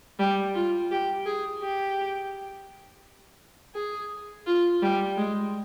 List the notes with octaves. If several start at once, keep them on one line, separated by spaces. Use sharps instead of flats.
G3
F4
G4
G#4
G4
G#4
F4
G3
G#3